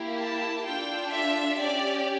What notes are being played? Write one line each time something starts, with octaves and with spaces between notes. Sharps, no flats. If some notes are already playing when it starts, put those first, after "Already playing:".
Already playing: A#3 E4 G4
A5
D4 F4 A4 G5
E5
C#4 G4 D5